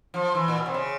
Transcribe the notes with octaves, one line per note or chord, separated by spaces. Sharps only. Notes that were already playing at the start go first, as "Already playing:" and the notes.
F3
E3
A#2
B2
C3
C#3